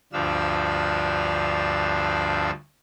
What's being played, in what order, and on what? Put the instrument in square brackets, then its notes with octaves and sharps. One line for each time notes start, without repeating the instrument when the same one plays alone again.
[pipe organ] D2 G2 F3 D4 F5 E6